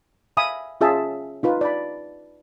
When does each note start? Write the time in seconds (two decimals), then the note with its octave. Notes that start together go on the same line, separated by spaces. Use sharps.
0.37 E5 F5 G#5 B5 D#6
0.81 C#4 F4 G#4 E5 A5
1.43 D#4 F4 B4
1.61 D5 B5